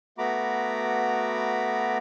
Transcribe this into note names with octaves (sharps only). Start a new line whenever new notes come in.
A3 B3 F#4 A#5 B5 D6